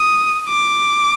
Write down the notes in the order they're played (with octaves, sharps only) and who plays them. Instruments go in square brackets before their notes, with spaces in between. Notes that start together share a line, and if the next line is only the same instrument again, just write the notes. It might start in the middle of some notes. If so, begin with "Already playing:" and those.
Already playing: [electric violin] D#6
D6